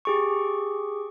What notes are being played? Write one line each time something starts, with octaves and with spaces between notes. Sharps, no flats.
G4 G#4 C#6